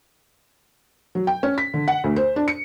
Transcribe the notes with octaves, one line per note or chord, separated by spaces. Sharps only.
F#3
G5
C#4
B6
D3
F#5
D2
C5
D4
C#7